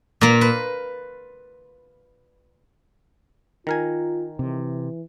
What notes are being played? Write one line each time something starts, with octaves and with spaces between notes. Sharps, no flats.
A#2 A#3
B4
D#3 F4 A#4 G#5
C3 E3